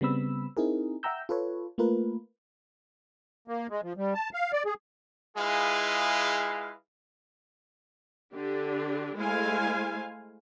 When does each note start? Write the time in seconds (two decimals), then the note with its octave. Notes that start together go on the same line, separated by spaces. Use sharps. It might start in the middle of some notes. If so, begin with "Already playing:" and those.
0.01 C#3 G3 B3 C4 B5 E6
0.57 C4 D#4 E4 G#4 A#4
1.03 E5 F#5 G5 A#5 E6 G6
1.29 F4 A4 B4 C#5
1.78 A3 A#3 F4 A#4 B4
3.48 A#3
3.70 G#3
3.83 F3
3.97 G3
4.14 A5
4.33 F5
4.53 D5
4.65 G#4
5.37 G#3 E4 F4 G#4 B4 F5
8.33 D3 D4 G4
9.16 G#3 A3 E4 C5 F5 G#5